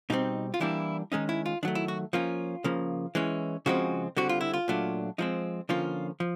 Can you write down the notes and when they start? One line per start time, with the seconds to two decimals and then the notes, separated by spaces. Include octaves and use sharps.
0.10 B2 G3 C4 D#4
0.54 F4
0.60 E3 G3 A#3 D4 E4
1.12 D#3 G#3 C#4 D#4
1.29 E4
1.46 F4
1.63 D#3 F#3 A3 D4
1.75 E4
1.88 F#4
2.13 F3 A#3 C#4 F4
2.64 C#3 F3 A#3
3.15 E3 G#3 C#4
3.66 C#3 F3 G#3 C4 F#4
4.17 D3 G3 C4 F#4
4.29 F4
4.41 E4
4.54 F4
4.68 A#2 F#3 A3 D4
5.18 F3 G#3 C4 D#4
5.69 D3 F3 A#3 C#4 F4
6.20 F3